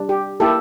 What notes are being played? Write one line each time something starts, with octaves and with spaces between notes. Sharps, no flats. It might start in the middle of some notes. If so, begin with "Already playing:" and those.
Already playing: G3 D4
G4
A#3 E4 G4 A4